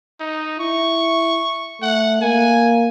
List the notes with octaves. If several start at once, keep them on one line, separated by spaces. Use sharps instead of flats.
D#4
E4 C#6
A3 F#5
A#3 G#5